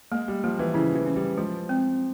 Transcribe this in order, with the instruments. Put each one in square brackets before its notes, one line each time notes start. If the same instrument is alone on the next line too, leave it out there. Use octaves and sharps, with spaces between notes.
[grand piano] G#3 [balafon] A#3
[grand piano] G3
[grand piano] F3 [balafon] A#3
[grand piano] E3
[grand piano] C#3 [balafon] E4
[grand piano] E3
[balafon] C#4
[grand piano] G3
[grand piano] F3 [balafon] G#3
[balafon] C4